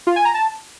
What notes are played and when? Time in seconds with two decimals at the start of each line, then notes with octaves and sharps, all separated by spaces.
0.07 F4
0.16 G#5
0.25 A#5
0.34 A5